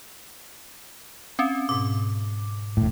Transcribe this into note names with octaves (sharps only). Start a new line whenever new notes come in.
C4 C#4
G#2 B2 D6
E1 A2